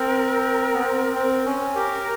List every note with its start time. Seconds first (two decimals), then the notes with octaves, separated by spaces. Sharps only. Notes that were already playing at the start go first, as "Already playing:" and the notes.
Already playing: C4 A#4
0.74 B3
0.83 C4
1.15 C4
1.46 C#4
1.75 G4 A#4